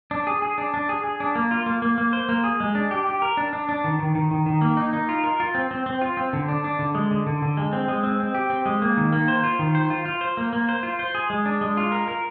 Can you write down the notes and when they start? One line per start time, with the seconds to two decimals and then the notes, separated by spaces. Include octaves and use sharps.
0.11 D4
0.27 G#4
0.42 G#4
0.58 D4
0.74 D4
0.89 G#4
1.04 G#4
1.20 D4
1.35 A#3
1.51 F4
1.66 A#3
1.82 A#3
1.98 A#3
2.13 C5
2.29 A#3
2.44 G#4
2.60 G#3
2.75 D4
2.91 G4
3.07 G4
3.22 A#4
3.37 D4
3.53 D4
3.69 D4
3.84 D#3
3.99 D#3
4.15 D#3
4.31 D#3
4.46 D#3
4.61 A#3
4.77 D#4
4.93 D#4
5.09 F4
5.24 A#4
5.40 F4
5.55 C4
5.71 C4
5.86 C4
6.01 F4
6.17 C4
6.33 D3
6.49 D4
6.64 D4
6.79 D3
6.95 G#3
7.11 D3
7.27 D3
7.42 D3
7.57 G#3
7.73 C4
7.88 G#3
8.04 C4
8.20 C4
8.35 G4
8.50 C4
8.66 G#3
8.82 A#3
8.97 D#3
9.13 A#3
9.28 C5
9.44 F4
9.59 D#3
9.75 C5
9.90 F4
10.05 F4
10.21 C5
10.37 A#3
10.53 A#3
10.69 C5
10.83 F4
10.99 C5
11.15 G#4
11.30 G#3
11.45 D4
11.61 G#3
11.77 F4
11.92 A#4
12.08 A#4